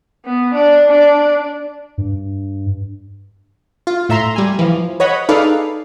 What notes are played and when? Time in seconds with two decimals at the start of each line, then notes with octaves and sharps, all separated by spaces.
0.25 B3
0.54 D4
0.90 D4
1.98 G2
3.87 F4
4.09 A2 E5 A#5 C6
4.36 G3 G#5
4.59 E3 F3
5.00 B4 C#5 D#5 F#5 B5
5.29 D#4 G#4 A4 B4 D5 F5